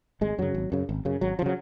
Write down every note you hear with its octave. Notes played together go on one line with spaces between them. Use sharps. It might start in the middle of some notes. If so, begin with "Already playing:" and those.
G#1 G#3
F#2 C#3 F#3
G#1
F#2 C#3
G#1
F#2 C#3
G#1 F#3
F3
C#3 F#3